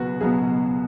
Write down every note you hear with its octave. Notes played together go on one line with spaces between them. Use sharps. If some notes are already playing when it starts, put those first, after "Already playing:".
Already playing: C#2 B2 F#3 B3 F#4 B4
C#2 B2 F#3 B3 G#4